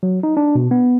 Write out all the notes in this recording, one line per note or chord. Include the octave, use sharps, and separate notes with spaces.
F#3
D#4
D4
B2
B3